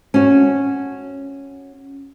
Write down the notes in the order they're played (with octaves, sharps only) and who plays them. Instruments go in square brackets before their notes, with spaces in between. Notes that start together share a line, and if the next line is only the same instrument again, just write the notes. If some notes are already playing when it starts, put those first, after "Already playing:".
[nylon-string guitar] C#4 F#4